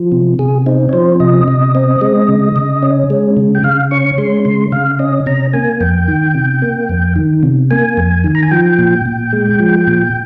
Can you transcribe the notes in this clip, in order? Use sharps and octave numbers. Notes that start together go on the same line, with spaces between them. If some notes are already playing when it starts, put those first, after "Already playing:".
Already playing: F3
C3
C3 G#4
C4 D#4
C#5
F3 C5
C3 D#5
C3
C4
G#3
C#3
C#3
C#4
G#3
C#3
G5
C#3 F5
C#4 C#6
G#3 C6
C#3 C6
C#3 F5
C#4 D#5
C3 A#5
A#3 G#5
F2 G5
D#3
C3
A#3
F2
D#3
C3
A#3 G#5
F2
D#3
A#5
G#5
F3 G5
A#2
A#2
G#3
F3
A#2